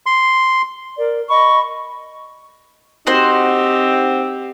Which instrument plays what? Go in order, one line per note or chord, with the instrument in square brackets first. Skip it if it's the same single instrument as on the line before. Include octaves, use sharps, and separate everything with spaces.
[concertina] C6
[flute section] A#4 D5
D#5 B5 C#6
[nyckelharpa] C4 G4 [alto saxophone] D#4 [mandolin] F#4 C5